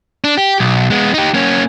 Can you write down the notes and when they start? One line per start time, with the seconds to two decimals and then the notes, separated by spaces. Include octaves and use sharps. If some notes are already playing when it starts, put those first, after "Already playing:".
0.24 D4
0.37 G4
0.60 B1
0.90 G#3 B3
1.14 D#4 G4
1.34 A#3 C#4